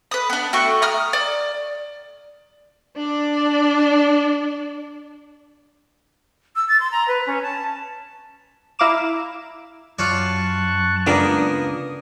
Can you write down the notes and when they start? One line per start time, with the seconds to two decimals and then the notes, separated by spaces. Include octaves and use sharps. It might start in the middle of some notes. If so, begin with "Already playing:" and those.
0.11 B4 D#6
0.30 B3 D4
0.53 A3 F#4 G5 C#6
0.82 A#5 D#6 F6
1.13 D5
2.97 D4 D5
6.56 E6
6.69 A6
6.80 C6
6.92 A#5
7.08 B4
7.27 C#4
7.42 A5
8.79 E4 F5 A#5 D6 E7
9.99 F#2 F4 C#5 D5 A5 C#6 F#6
11.07 C#2 A#3 B3 D4 A#4 D#6